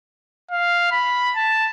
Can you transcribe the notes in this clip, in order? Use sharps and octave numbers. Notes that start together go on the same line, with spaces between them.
F5
B5
A5